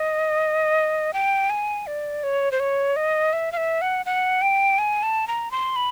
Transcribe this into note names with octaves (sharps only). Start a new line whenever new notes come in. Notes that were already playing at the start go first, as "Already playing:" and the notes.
Already playing: D#5
G5
G#5
D5
C#5
C5
C#5
D#5
E5
F5
E5
F#5
F#5
G5
G#5
A5
A#5
C6
B5